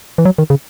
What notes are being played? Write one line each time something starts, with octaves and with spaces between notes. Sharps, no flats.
E3
F#3
D#3
C#3